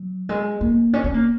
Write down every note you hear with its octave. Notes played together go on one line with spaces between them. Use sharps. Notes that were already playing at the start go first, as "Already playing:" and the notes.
Already playing: F#3
G#3
A#3
C#4
C#4
A#3